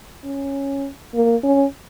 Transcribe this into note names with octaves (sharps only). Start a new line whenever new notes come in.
C#4
A#3
C#4